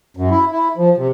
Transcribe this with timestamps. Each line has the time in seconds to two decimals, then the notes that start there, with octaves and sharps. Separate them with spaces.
0.17 F#2
0.31 E4
0.51 E4
0.77 F3
0.97 C3